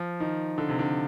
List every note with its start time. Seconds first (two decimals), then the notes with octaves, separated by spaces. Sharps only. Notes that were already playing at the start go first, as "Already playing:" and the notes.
Already playing: F3
0.20 D#3
0.58 D3
0.69 C3
0.79 D3